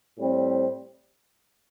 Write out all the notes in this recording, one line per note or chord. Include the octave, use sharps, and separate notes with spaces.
A2 G3 C4